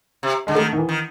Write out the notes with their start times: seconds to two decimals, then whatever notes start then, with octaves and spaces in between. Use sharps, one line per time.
0.23 C3
0.47 D3 G#3
0.55 D#3 A3
0.73 D#3
0.78 E3
0.89 D#3